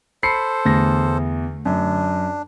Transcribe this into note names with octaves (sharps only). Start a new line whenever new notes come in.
A4 C5 B5 C7 C#7
E2 D3 A3 A#6
F#2 D4